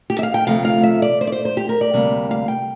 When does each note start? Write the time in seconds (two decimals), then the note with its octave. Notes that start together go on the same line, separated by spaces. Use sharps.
0.10 G4
0.19 E5
0.23 F5
0.34 G5
0.47 D2 C3 F3 A3 F5
0.65 F5
0.83 E5
1.02 D5
1.21 C5
1.27 D5
1.32 C5
1.45 C5
1.57 G4
1.69 A#4
1.81 D5
1.94 D2 C3 G3 A#3
2.31 F5
2.48 G5